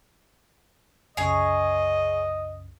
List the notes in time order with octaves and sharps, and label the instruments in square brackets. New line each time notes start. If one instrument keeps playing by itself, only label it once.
[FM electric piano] C2 F#2 C#3 [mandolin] G#4 C#5 [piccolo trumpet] D#5